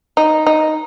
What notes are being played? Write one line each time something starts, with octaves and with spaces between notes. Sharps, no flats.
D#4
D#4